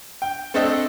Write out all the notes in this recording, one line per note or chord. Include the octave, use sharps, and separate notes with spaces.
G5
A3 C4 D4 A4 D#5